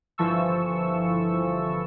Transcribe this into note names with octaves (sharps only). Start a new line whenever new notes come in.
G1 E3 F3 A4 C#6 E6